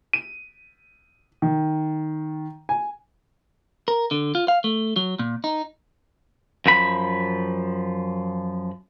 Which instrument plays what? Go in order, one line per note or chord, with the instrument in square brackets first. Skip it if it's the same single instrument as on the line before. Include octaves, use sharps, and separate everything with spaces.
[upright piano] D#7
D#3
G#5
[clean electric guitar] A#4
D3
F4
F5
A3
F#3
A#2
D#4
F#2 F3 B5